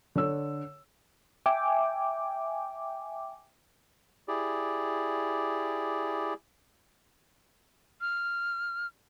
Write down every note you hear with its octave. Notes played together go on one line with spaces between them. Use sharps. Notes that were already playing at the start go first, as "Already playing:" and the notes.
D3 C#5 E6
E5 G5 G#5 D6
E4 G4 G#4 D5
F6